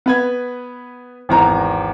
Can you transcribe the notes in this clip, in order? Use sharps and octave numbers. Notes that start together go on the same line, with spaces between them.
B3 B4 G#6
G#1 E2 A#5